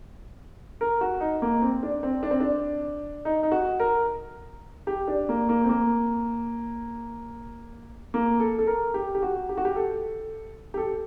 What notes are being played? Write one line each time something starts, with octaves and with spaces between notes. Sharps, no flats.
A#4
F#4
D#4
A#3
C4
D4
C4
D4
C4
D4
D#4
D#4
F#4
A#4
G4
D4
A#3
A#3
C4
A#3
A#3
A4
A4
A#4
G4
G4
F#4
G4
F#4
G4
A4
G4
A4